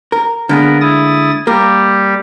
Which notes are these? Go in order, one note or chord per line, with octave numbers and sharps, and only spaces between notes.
A#4
D3 G#3 A#3 B3 A#4
E4 D#6 A6
G3 A#3 G4 A#4